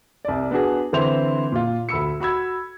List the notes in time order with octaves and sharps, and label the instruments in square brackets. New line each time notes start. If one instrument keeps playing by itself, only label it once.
[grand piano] C2 D5
B3 D4 F#4 G#4
D3 E3 C4 E4 C5 F7
A#2 F4
D2 B5 E6 C#7
F#4 B5 E6 G#6